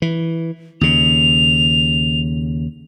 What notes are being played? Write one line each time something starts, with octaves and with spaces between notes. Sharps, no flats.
E3
D#2 C#3 F7